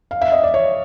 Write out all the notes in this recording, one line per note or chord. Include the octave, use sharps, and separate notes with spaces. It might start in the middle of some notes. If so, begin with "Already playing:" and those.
F5
E5
D#5
D5
C#5